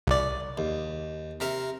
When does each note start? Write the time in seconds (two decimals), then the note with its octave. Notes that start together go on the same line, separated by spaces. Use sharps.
0.07 C2 D5
0.58 D#2
1.40 C3 A#4 E5